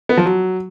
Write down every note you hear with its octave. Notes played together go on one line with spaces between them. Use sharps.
B3
F3
F#3